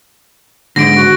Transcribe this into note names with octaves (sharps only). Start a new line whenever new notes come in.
G#2 D3 A#6 D7
F#4